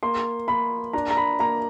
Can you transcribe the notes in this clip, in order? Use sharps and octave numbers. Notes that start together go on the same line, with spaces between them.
A#3 C6
A#3 B5
D4 A#5
A#5
B5
A#3 A#5